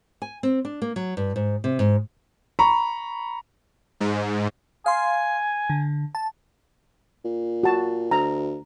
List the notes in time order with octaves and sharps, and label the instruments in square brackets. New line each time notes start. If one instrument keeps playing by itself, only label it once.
[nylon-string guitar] G#5
C4
D4
A#3
F#3
G2
G#2
C3
G#2
[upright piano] A#5 B5 C#6
[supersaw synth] G#2
[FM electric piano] F5 C6 [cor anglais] G#5
[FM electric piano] D3
A5
[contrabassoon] A#2
[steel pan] F#4 A5
[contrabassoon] D2 [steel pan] A#5